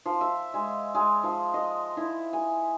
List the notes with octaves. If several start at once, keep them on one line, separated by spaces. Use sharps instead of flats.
F3
E5
G#3
G#3
F3
D#5
E4
G#5